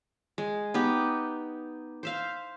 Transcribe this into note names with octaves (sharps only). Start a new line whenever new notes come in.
G#3
B3 D#4 G4
C5 E5 F5